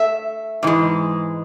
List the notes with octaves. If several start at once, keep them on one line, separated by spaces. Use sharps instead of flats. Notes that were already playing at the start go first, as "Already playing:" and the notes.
Already playing: A3 E5
G#2 E3 G#3